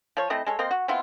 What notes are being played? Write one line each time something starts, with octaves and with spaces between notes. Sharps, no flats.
F3 C#5
A3 C4 E4 D#5
G#3 A4 C#5
A#3 C4 C5 D#5
F#4
B3 C4 E4 F4